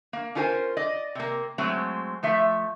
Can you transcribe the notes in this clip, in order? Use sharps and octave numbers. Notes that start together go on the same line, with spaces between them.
A#3
C#4 D4 F4 A#4 C5 G#5
D5 D#5
C3 A#3
F#3 G#3 A3 C4
F3 A3 E5